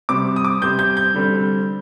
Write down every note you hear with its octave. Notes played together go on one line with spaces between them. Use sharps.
C3 G3 C4 D6
D#6
D6
C3 G3 C4 G6
G6
G6
D3 G3 C4